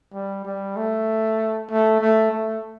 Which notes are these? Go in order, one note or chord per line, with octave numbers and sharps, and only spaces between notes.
G3
G3
A3
A3
A3
A3